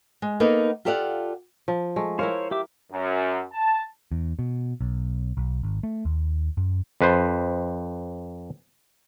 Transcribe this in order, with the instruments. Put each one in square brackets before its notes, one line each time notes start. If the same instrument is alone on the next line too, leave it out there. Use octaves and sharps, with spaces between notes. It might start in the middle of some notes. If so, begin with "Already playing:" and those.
[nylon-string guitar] G#3
A#3 B3 D#4 A4
F4 G4 A4 D5 F5 F#5
[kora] F3
G#3 A3
[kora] E4 A#4 F5 [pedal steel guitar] C5 C#5
[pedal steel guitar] G4 E5 D6
[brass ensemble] F#2
A5
[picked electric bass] E2
B2
B1
B1
G#1
A3
D#2
F#2
[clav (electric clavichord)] F2 B4 C5